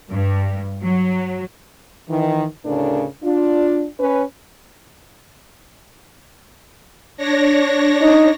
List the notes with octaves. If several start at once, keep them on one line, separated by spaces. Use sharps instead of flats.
G2
F#3
D#3 E3
D2 A2 C#3 D4 A4 A#4
D4 F4
C#4 B4
D4 C#5 A#6
D#4